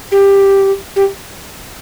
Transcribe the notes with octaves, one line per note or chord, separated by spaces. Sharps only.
G4
G4